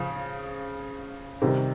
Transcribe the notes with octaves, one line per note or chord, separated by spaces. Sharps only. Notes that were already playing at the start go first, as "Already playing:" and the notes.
Already playing: C#3 F3
C3 D#3 G3